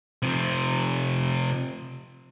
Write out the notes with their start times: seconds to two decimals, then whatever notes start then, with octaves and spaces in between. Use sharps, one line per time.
0.23 C3 F3